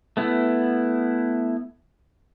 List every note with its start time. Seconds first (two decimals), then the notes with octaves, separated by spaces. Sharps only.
0.17 A3 B3 E4